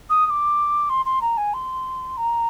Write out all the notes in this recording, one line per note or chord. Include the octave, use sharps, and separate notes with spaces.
D#6
D#6
D6
C6
C6
A#5
G#5
C6
A#5